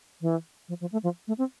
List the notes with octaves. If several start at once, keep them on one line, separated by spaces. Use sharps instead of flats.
E3
F3
F3
A3
F3
A3
C4